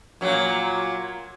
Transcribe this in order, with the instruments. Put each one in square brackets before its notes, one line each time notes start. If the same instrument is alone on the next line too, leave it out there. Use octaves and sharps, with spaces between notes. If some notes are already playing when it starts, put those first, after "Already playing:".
[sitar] A#2 F#3